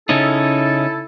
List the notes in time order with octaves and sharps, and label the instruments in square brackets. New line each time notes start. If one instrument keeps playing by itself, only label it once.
[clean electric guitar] C#3 C#4 D#4 [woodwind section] E4 A4